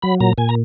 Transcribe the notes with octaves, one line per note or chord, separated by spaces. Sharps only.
F#3 B5
A#2 A#5
A#2 G#5
A#5